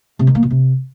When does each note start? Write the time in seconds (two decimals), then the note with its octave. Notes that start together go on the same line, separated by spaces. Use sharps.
0.19 C3
0.27 D#3
0.35 A#3
0.43 B2
0.50 C3